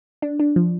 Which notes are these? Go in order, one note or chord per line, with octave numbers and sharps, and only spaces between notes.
D4
D4
F3